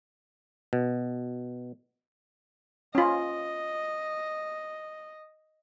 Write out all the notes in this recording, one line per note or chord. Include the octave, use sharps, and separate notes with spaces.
B2
C#4 F4 D#5